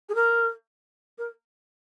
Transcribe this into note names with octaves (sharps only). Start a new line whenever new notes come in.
G#4
A#4
A#4